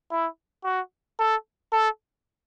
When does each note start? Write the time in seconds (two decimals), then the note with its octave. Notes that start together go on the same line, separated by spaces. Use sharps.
0.11 E4
0.64 F#4
1.19 A4
1.73 A4